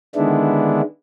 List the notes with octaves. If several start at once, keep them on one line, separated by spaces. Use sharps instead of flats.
D3 D#3 G#3 B3 D4 E4